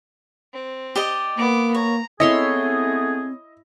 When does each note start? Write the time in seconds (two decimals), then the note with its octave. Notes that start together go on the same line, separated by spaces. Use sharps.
0.53 C4
0.96 G4 D5 D#5
1.37 A#3 B3 D6
1.74 C#5 A#5
2.20 A3 B3 C4 E4 G#4 C#5 D#5 C6